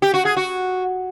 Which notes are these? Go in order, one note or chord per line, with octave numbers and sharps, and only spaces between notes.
G4
F#4
G#4
F#4